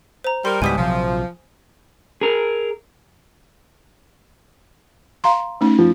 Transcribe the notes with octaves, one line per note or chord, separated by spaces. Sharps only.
C5 A#5
G3 A#4 C6
C#2 G#2 B2 E3 G3 G#5 D#6 B6
A#1 C3 F3 F#3
G#4 A#4
F5 A#5 C6
A3 C#4 D#4
F3